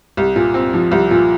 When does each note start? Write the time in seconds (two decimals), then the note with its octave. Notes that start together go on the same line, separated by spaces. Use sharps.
0.17 C2
0.36 A#2
0.54 C4
0.73 F3
0.92 C2
1.11 A#2